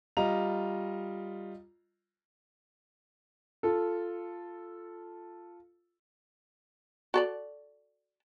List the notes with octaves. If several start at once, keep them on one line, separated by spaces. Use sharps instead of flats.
G3 F4 D#5 A#5 F7
F4 A4
F#4 A4 D5